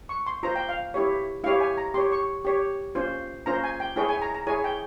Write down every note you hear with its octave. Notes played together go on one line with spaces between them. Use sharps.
C#6
C6
F4 C5 A#5
G5
F5
E4 G4 C#5
E4 G4 C#5 F5
G#5
A#5
G4 C#5 C6
C#6
G4 C#5
C#4 F4 C5
C#4 F4 C5 A#5
G#5
G5
E4 G#4 C#5 G5
G#5
A#5
A#5
E4 G#4 C#5 G#5
G5